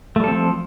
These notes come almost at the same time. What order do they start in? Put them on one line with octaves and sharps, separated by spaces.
A3 G3 A4 C4 F3